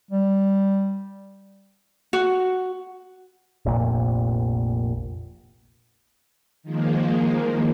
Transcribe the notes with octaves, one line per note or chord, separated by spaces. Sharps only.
G3
F#4
F1 A#1 A#2
D#3 F3 G#3 A#3